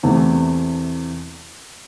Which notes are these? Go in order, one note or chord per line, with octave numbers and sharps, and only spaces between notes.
E2 C3 E3 A3